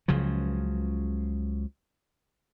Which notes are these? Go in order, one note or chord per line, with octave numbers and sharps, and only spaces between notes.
C#2 C#3 F3 F#3